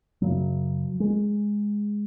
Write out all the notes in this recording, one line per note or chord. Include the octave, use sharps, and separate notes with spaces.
F#2 C#3 F#3
G#3